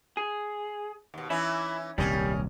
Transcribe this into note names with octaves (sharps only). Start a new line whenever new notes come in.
G#4
D#2 B2
E3 C#4 D#4 E4
D#1 C2 G3 C#4 A#4 D#5